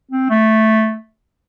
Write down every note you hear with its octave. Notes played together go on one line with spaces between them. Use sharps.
C4
A3